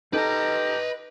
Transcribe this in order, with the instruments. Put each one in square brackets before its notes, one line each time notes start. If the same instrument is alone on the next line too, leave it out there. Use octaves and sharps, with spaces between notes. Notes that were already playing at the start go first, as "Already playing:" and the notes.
[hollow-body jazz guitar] D#4 A4 A5 [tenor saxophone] G4 [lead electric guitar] B4 A#5 [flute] D#5